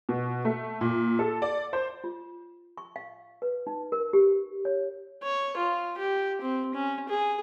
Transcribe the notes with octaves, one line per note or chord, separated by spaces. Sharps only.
B2
A3
A#2
A4
D5
C5
F4
C#6
F5
B4
D#4
A#4
G4
C#5
C#5
F4
G4
C4
C#4
G#4